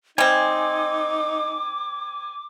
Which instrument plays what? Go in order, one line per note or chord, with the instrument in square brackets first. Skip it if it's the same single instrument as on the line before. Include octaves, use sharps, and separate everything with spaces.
[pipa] G3 C4 [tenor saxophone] D#4 [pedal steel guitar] G#5 [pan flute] D6